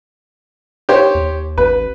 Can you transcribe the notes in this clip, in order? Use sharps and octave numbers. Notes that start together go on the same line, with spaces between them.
G4 C5 C#5
D#2
A1 B4